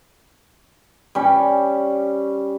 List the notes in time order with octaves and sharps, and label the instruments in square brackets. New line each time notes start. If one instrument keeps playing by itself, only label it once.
[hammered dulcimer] G3 C#4